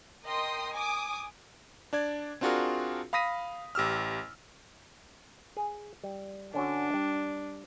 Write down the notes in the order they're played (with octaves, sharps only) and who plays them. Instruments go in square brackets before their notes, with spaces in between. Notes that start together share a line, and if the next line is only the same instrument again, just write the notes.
[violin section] A#4 D#5 G5 C6 D#6
G#5 D6 D#6
[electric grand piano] D4 D5 G#6
C4 D4 F4 F#4 G#4 A#4
F5 B5 D#6 A#6 B6 D#7
A1 G4 E6 F6
[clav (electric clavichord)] G#4
G3
[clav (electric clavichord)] D3 C#4 F#4 [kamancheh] D4
[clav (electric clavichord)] G3